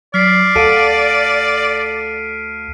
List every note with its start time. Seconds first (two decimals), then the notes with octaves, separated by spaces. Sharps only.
0.14 F#3 D5 F6 B6 C7
0.55 D2 A4 F5 F#5 D7 D#7